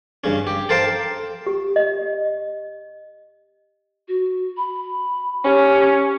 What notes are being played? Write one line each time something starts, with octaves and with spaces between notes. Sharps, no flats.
G2 C#3 C#4
G4
A4 A#4 C5 F5 G5 A5
G4
D#5
F#4
B5
C#4 G4